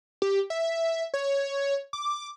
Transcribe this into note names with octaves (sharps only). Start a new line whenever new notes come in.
G4
E5
C#5
D6